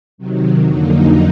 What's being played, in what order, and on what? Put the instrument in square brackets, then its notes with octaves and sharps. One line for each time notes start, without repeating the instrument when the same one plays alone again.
[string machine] C3 D#3 F#3
F2 D3 F#3 A#3 D#4